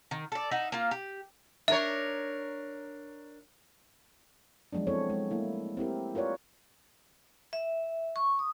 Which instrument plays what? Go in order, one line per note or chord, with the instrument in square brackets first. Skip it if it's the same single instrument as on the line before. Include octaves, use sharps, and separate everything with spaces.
[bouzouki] D#3
A4 D5
D#4 E5 F#5
A#3 F4
G4
[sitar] D4 A#4 C#5 [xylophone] E5
[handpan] F3 F#3 G#3 B3 D4
B3 C4 E4 A4 C#5
G#3
A3 A#3 E4
C4 E4 G4 A#4
F4 A#4 B4 C#5 D5
[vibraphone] E5
C#6
D#6